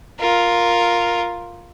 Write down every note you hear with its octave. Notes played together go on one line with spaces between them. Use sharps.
F4 A#4